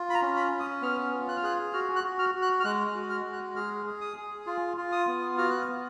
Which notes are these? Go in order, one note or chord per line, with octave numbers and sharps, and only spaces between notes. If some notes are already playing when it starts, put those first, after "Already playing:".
Already playing: F4
B5
A#5
C#4
B5
C#4
D#6
B3 F6
F4
F#6
F6
G#4 F#6
F#4 F6
F#6
F#4
F6
F#4
F#6
F6
G#3 F#6
F6
F#4
F6
G#3
F#6
G#4 F6
G#4
D#6
G#4
F4
F4
D#6
B3
F#4 F6
F#6
F6
B3